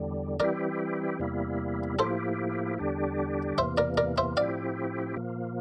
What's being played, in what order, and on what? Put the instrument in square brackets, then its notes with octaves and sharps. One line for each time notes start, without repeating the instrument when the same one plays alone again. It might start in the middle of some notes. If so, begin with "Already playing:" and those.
Already playing: [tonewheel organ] E2 D3 G3
[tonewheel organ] E3 G3 C4 E4 G4 [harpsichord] A#4 D5
[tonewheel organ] E2 C3 G3 A#3 E4
[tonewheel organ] A2 F3 A#3 E4 G4 [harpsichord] A4 C5
[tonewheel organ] E2 D3 G3 D4 G4
[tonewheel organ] E2 C3 E3 A#3 [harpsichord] C5 E5
[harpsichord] A#4 D5
A#4 D5
C5 E5
[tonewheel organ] A2 F3 C4 E4 G4 [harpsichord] D5 F5
[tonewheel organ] A#2 F3 A#3